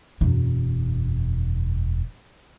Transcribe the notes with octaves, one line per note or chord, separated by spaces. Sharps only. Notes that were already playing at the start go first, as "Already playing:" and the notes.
E1 F#2